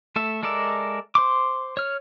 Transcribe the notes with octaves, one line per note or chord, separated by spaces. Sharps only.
A3 A4 E5
G#3 A4 A#4 D5 E5
C5 C6 D6
C#5 F6